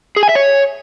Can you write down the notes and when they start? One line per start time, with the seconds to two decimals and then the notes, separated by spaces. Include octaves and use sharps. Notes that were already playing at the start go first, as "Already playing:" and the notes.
0.16 G#4
0.23 G#5
0.29 E5
0.35 C#5